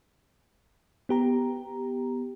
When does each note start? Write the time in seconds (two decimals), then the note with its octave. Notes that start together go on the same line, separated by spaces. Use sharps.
1.09 B3 G4 A#5